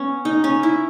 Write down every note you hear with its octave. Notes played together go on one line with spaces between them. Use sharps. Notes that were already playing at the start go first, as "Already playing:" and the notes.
Already playing: B3 C#4
D#4
C#4
E4